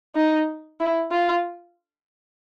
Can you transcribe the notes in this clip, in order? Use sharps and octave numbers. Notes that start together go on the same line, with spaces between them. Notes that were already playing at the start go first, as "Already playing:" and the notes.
D#4
E4
F4